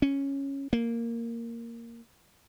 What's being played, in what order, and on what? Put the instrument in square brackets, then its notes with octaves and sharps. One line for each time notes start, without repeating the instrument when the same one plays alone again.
[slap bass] C#4
A#3